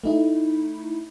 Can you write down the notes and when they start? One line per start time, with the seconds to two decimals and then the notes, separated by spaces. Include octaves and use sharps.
0.04 A3 D#4 E4